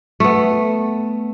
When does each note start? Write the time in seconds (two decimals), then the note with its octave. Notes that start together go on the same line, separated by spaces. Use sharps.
0.20 A3 B3